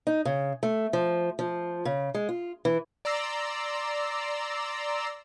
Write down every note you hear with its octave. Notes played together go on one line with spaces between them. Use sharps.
D#4
C#3
A3
F3
F3
C#3
G#3
F4
E3
D5 A#5 C6 E6